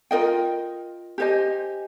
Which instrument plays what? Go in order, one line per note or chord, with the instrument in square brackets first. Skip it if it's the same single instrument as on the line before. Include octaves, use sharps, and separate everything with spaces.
[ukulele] F4 A#4 D#5 G5
G4 C5 D#5 G#5